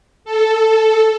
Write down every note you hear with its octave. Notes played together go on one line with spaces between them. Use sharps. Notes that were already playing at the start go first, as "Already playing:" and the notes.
A4